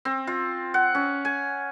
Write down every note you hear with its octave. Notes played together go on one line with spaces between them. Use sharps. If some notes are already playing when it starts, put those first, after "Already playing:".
C4
F4
F#5
C#4
G#5